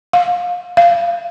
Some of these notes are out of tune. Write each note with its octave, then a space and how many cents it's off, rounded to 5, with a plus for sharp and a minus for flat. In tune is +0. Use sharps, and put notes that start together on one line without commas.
F5 +30
F5 -25